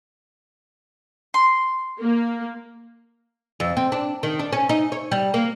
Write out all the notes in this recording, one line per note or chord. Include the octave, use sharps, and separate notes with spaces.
C6
A#3
F2
C4
D4
D#3
D4
C#4
D#4
C#5
G3
A#3